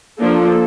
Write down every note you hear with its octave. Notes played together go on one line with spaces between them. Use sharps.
F3 A#3 D4 A4